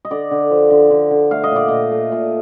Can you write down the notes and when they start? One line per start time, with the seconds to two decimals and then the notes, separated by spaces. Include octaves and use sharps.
0.05 D#5
0.11 D3 D5
0.31 D3
0.51 F3
0.70 D3
0.91 D3
1.11 D3
1.31 A3 F5
1.44 D#5
1.51 A#2 D5
1.68 A#2 D#5
1.92 A3
2.12 A#2